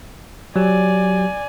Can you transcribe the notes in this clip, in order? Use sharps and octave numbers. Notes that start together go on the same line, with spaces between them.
F#3 G4 D5 G#5